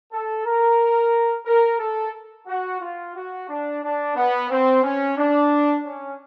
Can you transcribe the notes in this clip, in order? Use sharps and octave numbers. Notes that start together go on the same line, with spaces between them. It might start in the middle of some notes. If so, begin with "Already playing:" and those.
A4
A#4
A#4
A4
F#4
F4
F#4
D4
D4
B3
C4
C#4
D4
C#4